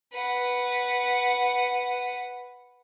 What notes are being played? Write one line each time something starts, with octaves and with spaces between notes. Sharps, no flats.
B4 F#5